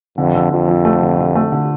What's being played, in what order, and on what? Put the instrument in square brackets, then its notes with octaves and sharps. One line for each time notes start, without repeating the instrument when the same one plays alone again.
[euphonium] F2 [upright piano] D3
[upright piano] D3
[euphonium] F2 [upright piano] F3
[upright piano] F3
A3
D3
D3
A3
D3